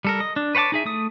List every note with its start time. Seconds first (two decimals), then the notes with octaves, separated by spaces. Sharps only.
0.05 G3 A4 A#4
0.20 D#5
0.36 D4
0.55 B4 C#5 F#5 A5 D6
0.72 D#4 G#4 E5
0.85 A3 D#6